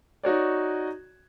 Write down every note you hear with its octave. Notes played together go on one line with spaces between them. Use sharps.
D#4 F#4 C#5 D5